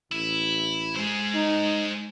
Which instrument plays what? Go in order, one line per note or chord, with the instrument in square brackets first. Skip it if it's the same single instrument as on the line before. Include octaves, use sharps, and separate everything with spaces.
[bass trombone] A1 [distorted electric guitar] E4
[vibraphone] G#3 [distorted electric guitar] G#4 C5
[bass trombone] D#4